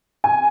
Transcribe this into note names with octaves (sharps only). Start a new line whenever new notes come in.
G#5